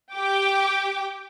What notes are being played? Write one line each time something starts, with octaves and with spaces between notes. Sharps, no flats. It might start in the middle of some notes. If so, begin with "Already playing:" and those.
G4 G5 D6